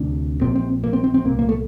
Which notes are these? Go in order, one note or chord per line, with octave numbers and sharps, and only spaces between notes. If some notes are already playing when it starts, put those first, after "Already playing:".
Already playing: D2 C3 D4
A#1 A#2 C4
C4
A#3
C4
C4
C4
C2 A#2 A#3
A#3
A3